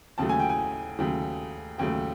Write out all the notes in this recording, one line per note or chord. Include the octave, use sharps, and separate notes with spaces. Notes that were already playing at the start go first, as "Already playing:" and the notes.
D#2 C#3 F#3 A3 A5
G#5
G5
G#5
D#2 C#3 F#3 A3
D#2 C#3 F#3 A3 G5